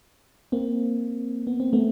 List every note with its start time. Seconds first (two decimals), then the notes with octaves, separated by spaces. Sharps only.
0.52 A#3 C4
1.47 B3
1.60 C4
1.73 A3 B3